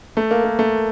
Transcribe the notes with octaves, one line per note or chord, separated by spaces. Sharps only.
A3
A#3
A#3
A3